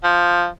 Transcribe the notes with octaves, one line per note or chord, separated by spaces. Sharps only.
F3